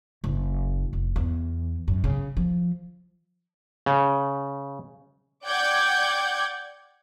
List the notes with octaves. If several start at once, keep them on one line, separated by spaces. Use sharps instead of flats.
F#1
F1
E2
F#2
C#3
F3
C#3
D5 F#5 G5 D6 G6 G#6